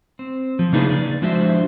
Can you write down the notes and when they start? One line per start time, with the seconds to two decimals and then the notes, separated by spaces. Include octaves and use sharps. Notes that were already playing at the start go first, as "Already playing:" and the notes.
0.19 C4
0.59 F3
0.73 C#3 A#3 D4 D#4 G#4 B4
0.90 D5
1.22 F3 G#3 D4 F#4 C5 E5